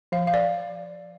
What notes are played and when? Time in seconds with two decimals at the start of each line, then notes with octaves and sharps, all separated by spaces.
0.12 F3 F5
0.27 F5
0.34 D5